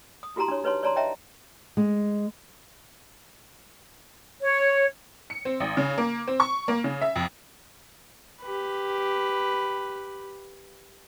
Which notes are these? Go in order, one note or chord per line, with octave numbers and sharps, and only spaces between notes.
D#6
E4 F#4 G4 A5 A#5 C6
D4 C#5
D#4 B4 C#5 A5 C6
C#5 D5 A5 A#5 C6
C#5 D#5 E5 G5 A5 A#5
G#3
C#5
C#7
C4
G#1
C#3
A#3
C4
C#6
A#3
C#3
E5
F2
G4 B4